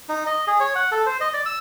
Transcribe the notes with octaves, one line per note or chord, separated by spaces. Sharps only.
D#4
D#5
G#4
C#5
F#5
A4
C5
D#5
D5
E6